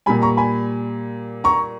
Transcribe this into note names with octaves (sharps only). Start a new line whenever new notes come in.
A#2 G3 G#5 B5
A#5 C#6
G#5 B5
A#5 C#6